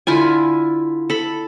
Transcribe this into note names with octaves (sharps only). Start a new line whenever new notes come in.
D3 E4 F4 G#5
A4 B5